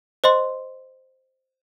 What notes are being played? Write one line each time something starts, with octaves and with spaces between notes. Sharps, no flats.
C5 D#5 C6